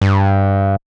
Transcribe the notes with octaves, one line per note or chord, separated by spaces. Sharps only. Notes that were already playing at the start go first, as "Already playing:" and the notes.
G2